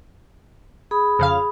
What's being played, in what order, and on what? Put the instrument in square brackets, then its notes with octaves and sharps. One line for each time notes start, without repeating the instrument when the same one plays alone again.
[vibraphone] G#4 B5 D#6
[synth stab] F2 C#3 F5